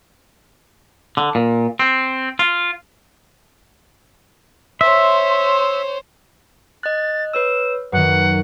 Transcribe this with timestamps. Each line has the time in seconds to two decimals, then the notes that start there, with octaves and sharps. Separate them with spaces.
1.17 D3
1.35 A#2
1.79 C4
2.39 F4
4.81 C5 C#5 E5 C6
6.83 D#5 F#6 A6
7.34 B4 C#5 E6 E7
7.92 F#2 D#3 B4 F#5